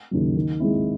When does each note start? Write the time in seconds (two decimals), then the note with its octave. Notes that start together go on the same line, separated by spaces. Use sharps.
0.11 D#2 C#3 F#3
0.36 D#3
0.60 G#3 C4 E4